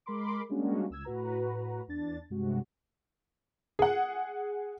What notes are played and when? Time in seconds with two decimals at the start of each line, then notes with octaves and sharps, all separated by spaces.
0.06 G#3 A#4 B5 C6 D6
0.49 G3 G#3 A#3 C#4 D4 F#4
0.90 C#2 E6 G#6
1.05 A2 F#4 B4 A#5
1.88 E2 D4 A6
2.30 G2 C3 G#3 F#4
3.79 G#4 F#5